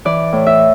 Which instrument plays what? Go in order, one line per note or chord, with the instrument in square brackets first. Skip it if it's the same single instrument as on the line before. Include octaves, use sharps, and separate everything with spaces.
[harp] E3 D5
A2
E5